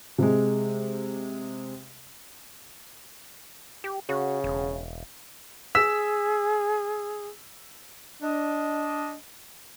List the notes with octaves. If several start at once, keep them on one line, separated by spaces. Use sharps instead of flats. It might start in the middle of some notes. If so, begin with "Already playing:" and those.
C3 G#3
G4
C#3 F#4
E1
G#4 E6 B6 E7
D4 D#5